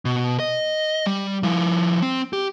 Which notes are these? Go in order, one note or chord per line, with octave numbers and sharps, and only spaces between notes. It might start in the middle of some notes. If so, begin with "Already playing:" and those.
B2
D#5
G3
F3 E4
C4
G4